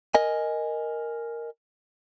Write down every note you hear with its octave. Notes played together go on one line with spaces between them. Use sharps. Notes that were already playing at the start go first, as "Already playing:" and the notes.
A#4 D#5 G#5